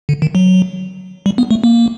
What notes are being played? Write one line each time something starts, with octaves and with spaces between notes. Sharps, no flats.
D3
D#3
F#3
G3
B3
A3
A#3